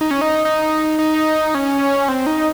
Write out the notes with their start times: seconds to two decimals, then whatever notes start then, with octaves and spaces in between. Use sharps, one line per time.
0.01 D#4
0.11 C#4
0.21 D#4
0.45 D#4
0.99 D#4
1.55 C#4
2.09 C4
2.26 D#4